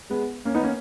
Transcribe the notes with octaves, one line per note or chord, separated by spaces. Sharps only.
G#3 B3
A#3 C#4
B3 D#4
A#3 C#4